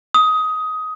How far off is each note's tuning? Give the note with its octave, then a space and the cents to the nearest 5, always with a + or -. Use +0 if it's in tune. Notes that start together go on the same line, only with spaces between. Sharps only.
D#6 +15